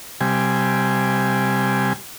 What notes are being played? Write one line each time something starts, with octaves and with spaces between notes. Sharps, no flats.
C3 G3 G#5